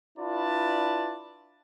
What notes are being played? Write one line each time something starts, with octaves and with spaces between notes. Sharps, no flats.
D4 E4 F4 B4 D5 A5